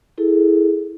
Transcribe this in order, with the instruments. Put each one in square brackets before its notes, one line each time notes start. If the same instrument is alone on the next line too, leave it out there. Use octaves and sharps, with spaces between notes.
[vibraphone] E4 G#4 A4